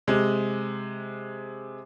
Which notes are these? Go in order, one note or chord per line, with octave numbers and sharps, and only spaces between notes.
C3 G#3